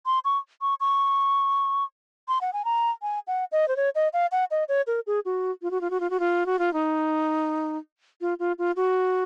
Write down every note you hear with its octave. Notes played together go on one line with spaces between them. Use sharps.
C6
C#6
C#6
C#6
C6
F#5
G#5
A#5
G#5
F#5
D#5
C5
C#5
D#5
F5
F#5
D#5
C#5
A#4
G#4
F#4
F4
F#4
F4
F#4
F4
F#4
F4
F#4
F4
D#4
F4
F4
F4
F#4